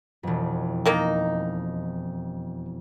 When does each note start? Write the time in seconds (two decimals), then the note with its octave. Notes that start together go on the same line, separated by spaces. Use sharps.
0.23 E1 F2
0.86 D#3 A#3 D#4